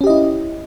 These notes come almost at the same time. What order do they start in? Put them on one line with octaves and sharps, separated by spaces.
C#4 G4 D#5 E4